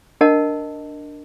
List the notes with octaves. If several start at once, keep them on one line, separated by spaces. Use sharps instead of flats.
D4 A#4 D#5 F#5 A5